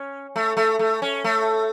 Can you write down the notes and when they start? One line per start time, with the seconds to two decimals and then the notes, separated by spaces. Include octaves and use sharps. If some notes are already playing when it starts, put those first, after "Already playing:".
Already playing: C#4
0.36 A3
0.57 A3
0.79 A3
1.02 C#4
1.24 A3